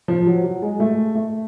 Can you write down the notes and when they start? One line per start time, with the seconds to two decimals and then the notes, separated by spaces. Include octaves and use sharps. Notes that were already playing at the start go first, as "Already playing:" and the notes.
0.08 F3
0.27 F#3
0.44 F#3
0.62 G#3
0.80 A3
1.15 A3